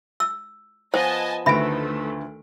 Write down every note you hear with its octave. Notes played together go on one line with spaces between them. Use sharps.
E6
F3 B3 C5 D#5 G#5 A5
D2 D#3 A3 B4 E5 B5 D7